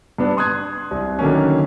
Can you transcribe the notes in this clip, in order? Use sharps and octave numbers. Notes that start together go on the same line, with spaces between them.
G2 B3 D4
C6 D#6 F#6 G#6
C2 C3
D3 D#3 F#3 A#3 C#4